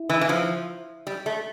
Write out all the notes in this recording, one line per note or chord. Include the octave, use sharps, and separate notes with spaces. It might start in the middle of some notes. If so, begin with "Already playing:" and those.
Already playing: E4
E3
E3
F3
G3
A3